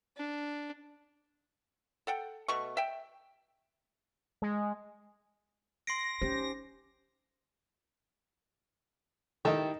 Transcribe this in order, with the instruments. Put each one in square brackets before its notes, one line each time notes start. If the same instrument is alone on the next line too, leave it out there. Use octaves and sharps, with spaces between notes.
[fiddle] D4
[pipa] A4 F#5 G5
B2 A3 C#6
E5 G5
[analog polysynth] G#3
[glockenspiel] C6 C7 D7 [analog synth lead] A#6
[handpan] C#4 G4 C5 [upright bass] D#4
[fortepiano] D#3 D#4 [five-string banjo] E4 G4 A4